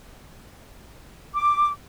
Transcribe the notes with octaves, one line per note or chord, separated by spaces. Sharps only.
D6